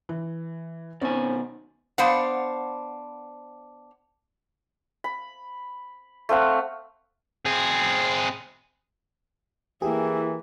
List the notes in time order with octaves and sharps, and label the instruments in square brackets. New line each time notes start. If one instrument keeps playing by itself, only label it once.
[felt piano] E3
[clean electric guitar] B2 D#3 G#5 [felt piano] C4 C#4
[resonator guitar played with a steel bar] B3 D4 C5 F5 F#5
[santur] B5
A3 C4 F5 F#5
[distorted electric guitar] C4 G#4
[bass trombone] E3 [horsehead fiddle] A#3 E4 [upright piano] G4 [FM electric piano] G#4